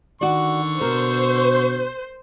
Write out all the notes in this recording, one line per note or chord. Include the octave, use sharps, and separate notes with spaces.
D3 D#3 F#4 D5 C#6
B2 A#4 C5